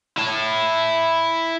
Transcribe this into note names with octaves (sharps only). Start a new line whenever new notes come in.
E4 A5